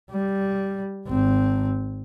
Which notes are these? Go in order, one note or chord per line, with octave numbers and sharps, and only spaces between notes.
G3
G#1 C4